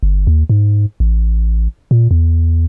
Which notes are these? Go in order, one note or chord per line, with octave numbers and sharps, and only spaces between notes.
G1
D#2
G#2
A1
A#2
E2